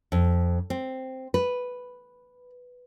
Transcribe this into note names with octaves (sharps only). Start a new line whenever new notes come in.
F2
C4
B4